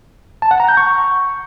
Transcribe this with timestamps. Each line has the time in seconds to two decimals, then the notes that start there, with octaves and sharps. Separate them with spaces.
0.42 A5
0.51 F#5
0.60 A#5
0.68 G6
0.77 C#6